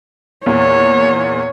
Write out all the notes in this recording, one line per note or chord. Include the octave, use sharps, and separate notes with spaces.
E2 A#2 C#5